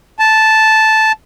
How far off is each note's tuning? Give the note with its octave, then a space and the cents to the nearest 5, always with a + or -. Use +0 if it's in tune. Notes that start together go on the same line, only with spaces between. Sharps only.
A5 -5